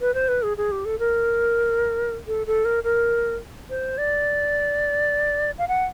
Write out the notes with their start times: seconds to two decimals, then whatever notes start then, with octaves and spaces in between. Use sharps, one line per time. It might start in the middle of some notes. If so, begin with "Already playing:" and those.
0.01 B4
0.14 C5
0.28 B4
0.43 G#4
0.57 G#4
0.71 G4
0.85 A4
0.99 A#4
2.28 A4
2.47 A4
2.65 A#4
2.84 A#4
3.70 C5
3.98 D5
5.58 F5
5.68 F#5